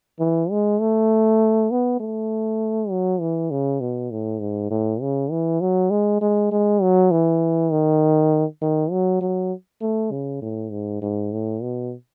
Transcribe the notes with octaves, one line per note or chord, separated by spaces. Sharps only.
E3
G#3
A3
B3
A3
F#3
E3
C#3
B2
A2
G#2
A2
C#3
E3
F#3
G#3
G#3
G#3
F#3
E3
D#3
D#3
F#3
F#3
A3
C#3
A2
G#2
G#2
A2
B2